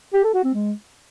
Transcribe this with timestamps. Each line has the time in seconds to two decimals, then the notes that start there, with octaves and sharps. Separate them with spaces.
0.14 G4
0.24 A4
0.34 F#4
0.44 C4
0.54 G#3